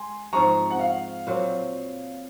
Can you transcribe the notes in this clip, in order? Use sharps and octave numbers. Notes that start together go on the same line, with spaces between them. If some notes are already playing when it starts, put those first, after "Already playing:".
Already playing: G#3 G#5 C6
G#2 F3 G#3 C4 A#5 C#6
F#5
F5
A#2 F#3 C4 F#4